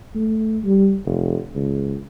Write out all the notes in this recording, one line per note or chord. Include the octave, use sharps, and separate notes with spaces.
A3
G3
F1
C#2